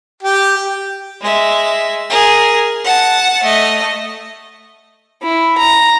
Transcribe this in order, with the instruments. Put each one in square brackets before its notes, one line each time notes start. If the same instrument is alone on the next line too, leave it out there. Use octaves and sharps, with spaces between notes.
[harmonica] G4
[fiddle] G#3 E5
G#4 A#4
F#5 A5
A3 D#5
[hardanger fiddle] E4
A#5